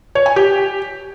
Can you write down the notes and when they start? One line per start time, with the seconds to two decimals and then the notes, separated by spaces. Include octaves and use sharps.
0.15 C#5
0.26 G#5
0.36 G4